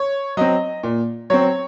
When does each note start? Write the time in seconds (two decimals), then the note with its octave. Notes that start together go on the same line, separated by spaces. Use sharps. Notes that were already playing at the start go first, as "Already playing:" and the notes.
Already playing: C#5
0.37 F#3 C4 D#5
0.83 A#2
1.30 F#3 C4 C#5